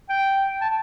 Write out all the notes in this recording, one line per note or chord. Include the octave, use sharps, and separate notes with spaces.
G5
A5